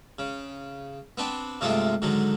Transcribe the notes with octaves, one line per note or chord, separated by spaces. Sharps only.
C#3
B3 C4 D4
G2 C3 G#3 A3 C4 F4
G#2 D3 D#3 F#3